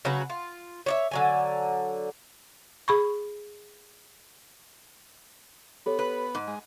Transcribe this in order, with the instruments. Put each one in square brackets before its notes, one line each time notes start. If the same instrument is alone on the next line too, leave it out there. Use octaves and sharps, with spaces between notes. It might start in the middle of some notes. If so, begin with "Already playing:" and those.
[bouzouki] C#3 F#3 F#4 B4
F4
C#5 D5 E5
D3 F#3 G#5
[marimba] G#4 B5 C#6
[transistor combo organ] B3 [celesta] G4 A4 C#5
[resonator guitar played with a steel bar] B4
[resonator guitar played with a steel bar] G#2 [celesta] D#5
[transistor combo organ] G#3